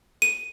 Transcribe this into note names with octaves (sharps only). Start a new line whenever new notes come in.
D#7